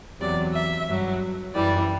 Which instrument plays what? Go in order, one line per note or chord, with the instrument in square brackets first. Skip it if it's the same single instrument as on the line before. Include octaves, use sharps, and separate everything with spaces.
[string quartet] E2 C3 F#3 D5
E5
G2 F#3
F#2 E3 G3 D5